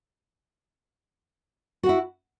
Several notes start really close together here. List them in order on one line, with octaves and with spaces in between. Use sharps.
F#4 F#5 E4